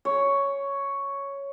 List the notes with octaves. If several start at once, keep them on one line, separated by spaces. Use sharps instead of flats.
C#5